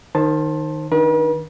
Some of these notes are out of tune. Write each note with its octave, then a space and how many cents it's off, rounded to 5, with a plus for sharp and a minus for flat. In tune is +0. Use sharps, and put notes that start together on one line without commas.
D#3 -10 C5 +25 A5 +0
D#3 +0 D4 -5 B4 -45